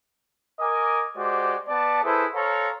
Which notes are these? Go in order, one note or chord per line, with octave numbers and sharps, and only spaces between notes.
A#4 D#5 G#5 D6
G#3 F#4 G4 C5 D5
B3 D5 A5
E4 G#4 A4 B4 C5
A4 C5 C#5 F5 A#5